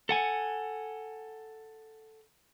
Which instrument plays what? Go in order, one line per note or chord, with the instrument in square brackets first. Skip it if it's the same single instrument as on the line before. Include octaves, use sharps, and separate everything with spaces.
[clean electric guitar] A4 F#5 G#5